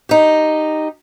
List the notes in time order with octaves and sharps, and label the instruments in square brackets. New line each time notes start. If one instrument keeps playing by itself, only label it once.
[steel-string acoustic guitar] D#4 G4